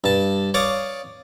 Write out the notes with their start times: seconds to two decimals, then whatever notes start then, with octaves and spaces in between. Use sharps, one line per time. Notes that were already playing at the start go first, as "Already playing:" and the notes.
0.04 G2 A5
0.54 C#5 D5 F5 D#6